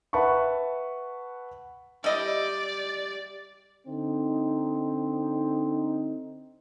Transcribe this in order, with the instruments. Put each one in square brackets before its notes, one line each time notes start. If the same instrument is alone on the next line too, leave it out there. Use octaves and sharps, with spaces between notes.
[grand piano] B4 E5 F#5 A5 B5 C#6
[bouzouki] G3 G4 [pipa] E4 D#5 [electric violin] D5
[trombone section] D3 C4 D#4